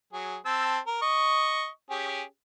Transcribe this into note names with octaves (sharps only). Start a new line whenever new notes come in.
F#3 G#4
C4 A5 E6
A#4
D#5 C#6
C#4 G4 G#4